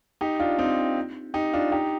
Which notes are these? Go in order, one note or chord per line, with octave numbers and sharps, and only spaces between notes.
D#4 G4
D4 F4
C4 D#4
D#4 G4
D4 F4
D#4 G4